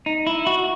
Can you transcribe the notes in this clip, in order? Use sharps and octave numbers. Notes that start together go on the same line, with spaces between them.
D#4
E4
F#4